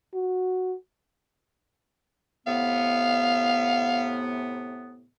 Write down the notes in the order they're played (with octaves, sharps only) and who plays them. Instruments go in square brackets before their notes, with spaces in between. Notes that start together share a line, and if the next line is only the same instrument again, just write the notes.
[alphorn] F#4
[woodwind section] A2 C3 B3 [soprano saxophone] F5